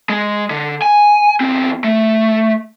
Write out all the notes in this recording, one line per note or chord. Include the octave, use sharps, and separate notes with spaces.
G#3
D3
G#5
E2 C4
A3